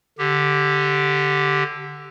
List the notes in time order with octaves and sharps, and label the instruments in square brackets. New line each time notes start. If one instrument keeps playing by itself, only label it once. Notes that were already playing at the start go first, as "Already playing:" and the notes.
[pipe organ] D3 G4